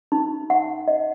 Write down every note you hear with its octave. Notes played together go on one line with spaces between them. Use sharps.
D#4
F#5
D#5